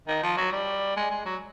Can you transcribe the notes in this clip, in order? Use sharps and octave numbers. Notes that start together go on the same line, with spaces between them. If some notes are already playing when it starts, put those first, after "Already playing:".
D#3
F3
F#3
G3
G#3
G#3
F#3